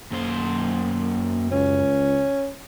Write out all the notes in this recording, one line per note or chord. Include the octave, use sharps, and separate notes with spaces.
F#2 A#3 C5
C#2 C#4